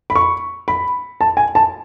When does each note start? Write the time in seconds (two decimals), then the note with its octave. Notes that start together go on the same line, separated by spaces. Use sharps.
0.10 B5
0.15 C#6
0.68 B5
1.21 A5
1.37 G#5
1.55 A5